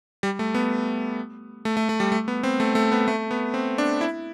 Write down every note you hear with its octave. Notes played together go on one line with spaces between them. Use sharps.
G3
A3
B3
A3
A3
A3
G3
A3
B3
C4
A3
A3
B3
A3
B3
C4
D4
E4